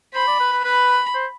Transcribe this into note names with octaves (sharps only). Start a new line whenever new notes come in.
C5 B5
D5
B4
B4
B4 B5
C5